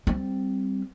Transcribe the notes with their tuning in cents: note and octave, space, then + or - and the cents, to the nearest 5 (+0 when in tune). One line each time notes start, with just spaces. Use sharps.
G3 +0 C4 +0